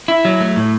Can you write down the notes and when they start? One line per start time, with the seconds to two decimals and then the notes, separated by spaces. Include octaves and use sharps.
0.08 E4
0.25 F#3
0.41 A3
0.56 A2